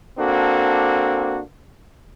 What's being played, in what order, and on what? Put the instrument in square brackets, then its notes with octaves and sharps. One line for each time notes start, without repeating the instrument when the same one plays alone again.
[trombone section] A#3 C4 D4 F#4 A4